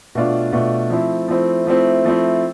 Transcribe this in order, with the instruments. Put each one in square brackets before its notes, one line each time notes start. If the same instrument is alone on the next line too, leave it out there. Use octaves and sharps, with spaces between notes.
[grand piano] B2 A3 D4 F4
B2 A3 D4 F4
F3 A3 C4 E4
F3 A3 C4 E4
F3 A3 C4 E4
F3 A3 C4 E4